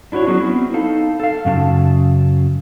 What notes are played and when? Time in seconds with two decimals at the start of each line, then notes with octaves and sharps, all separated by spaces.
0.12 D4 E4 F#4 B4 C#5
0.27 F#3 B3 C#4 F#4 G#4
0.40 B3 C4 E4
0.74 D#4 A4 F5 A5
1.20 A4 F5
1.45 F#2 C#3 F4 A5